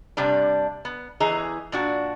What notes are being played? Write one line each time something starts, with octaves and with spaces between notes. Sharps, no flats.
G2 C3 G3 D4
B3
E2 E3 G#4 D#5 A#5
A#2 D4 F#4